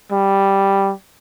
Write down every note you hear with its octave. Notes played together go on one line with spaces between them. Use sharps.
G3